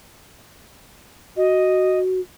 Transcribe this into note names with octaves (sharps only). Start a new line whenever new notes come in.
F#4 D#5